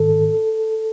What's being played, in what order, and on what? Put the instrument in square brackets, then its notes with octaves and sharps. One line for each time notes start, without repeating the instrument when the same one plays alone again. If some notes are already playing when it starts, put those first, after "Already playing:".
Already playing: [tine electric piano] G#2 D#3 A4